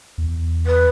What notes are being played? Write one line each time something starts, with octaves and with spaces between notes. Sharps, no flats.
E2
B4